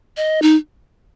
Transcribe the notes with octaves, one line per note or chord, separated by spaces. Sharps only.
D#5
D#4